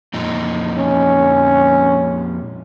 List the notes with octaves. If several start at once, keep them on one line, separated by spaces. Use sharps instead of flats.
F2 A#2 D#4
C#4